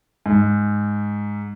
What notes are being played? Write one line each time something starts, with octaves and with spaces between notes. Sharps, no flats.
G#2